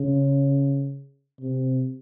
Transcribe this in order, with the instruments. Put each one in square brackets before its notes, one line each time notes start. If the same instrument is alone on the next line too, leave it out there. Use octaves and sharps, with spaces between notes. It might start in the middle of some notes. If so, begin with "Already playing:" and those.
Already playing: [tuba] C#3
C3